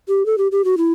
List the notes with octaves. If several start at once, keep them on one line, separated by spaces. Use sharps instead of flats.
G4
A4
G4
G4
F#4
E4